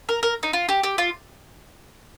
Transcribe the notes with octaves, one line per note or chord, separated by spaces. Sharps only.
A#4
A#4
D#4
F4
G4
G4
F4